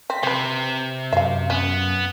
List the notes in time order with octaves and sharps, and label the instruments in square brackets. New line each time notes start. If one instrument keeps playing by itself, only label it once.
[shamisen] C4 [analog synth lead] B6
[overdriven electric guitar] C3 [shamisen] C4 B4
[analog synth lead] F#2 [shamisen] E5 F5
[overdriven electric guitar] B3 [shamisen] C#4